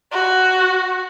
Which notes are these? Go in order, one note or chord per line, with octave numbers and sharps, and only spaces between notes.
F#4